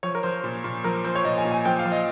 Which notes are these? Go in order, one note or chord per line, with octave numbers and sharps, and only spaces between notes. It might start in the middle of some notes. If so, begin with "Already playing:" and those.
F3 C#5
A#4
F3 C5
A#2
A#2
F3 A#4
F3 C5
C#5
A#2 D#5
G#5
A#2
G#5
F3 G5
F5
F3
D#5